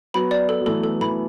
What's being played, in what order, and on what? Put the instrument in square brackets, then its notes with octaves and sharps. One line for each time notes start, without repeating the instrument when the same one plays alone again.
[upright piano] F#3 B3 [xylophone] B5
[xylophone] D5
A4
[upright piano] F#3
[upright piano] E3 A3 [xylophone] A4
[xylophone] A4
[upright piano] E3 A3 [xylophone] B5